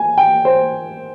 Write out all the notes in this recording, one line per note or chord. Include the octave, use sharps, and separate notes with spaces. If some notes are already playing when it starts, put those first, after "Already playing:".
Already playing: G#5
G5
C5